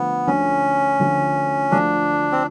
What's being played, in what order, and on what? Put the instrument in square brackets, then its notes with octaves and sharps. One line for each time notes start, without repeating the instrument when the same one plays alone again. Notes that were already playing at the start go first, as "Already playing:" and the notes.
Already playing: [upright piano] D3 F3 A3 [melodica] B3
[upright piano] D2 D3 F3 A3 [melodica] C#4
[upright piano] D2 D3 F3 A3
[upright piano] D2 D3 F3 A3 [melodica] D4
[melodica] C4